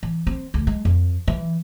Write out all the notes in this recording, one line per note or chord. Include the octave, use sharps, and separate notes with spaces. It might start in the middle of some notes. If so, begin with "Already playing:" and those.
E3
C4
D2
G#3
F2
E3